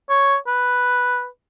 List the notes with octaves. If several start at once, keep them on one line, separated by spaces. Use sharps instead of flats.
C#5
B4